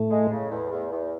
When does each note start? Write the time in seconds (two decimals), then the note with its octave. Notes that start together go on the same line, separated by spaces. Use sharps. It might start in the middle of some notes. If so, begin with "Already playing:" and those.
Already playing: A2 A3
0.10 G#3
0.31 C#3
0.50 E2
0.71 E2
0.91 E2